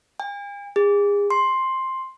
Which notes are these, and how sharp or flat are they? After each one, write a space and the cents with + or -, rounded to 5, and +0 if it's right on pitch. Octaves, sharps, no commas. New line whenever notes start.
G#5 -45
G#4 -35
C6 +10